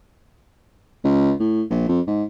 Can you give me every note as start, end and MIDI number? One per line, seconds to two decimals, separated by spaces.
1.04 1.32 37
1.39 1.62 45
1.70 1.85 34
1.88 2.00 41
2.07 2.23 44